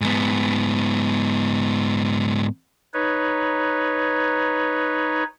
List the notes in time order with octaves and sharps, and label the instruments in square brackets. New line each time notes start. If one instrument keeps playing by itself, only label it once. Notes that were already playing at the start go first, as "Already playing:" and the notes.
[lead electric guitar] G#2 B3
[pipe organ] D#4 B4 C#5